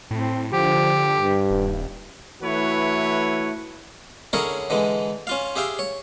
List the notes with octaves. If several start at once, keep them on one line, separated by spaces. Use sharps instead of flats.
A2 C4
D3 F3 G4
G2
D#1
E3 A3 E4 F#4 B4 C#5
D3 C#4 E4 G#4 A#4 C#5
D3 E3 G#3
C#4 F4 F5
G4 G#4 E5 F5 G5
C#5